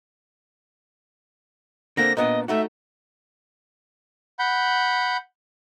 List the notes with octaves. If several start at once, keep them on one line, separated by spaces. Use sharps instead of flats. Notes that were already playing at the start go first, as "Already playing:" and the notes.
D3 A#3 C4 A#6
A#2 B3 D4 D#5
A3 D#4 F#4 E5
F#5 B5 G6